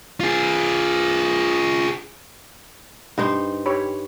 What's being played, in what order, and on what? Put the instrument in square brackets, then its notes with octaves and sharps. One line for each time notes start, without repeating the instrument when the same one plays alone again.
[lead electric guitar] F4 G#4
[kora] G2 D#4 C5
[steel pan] G4 C#5 B5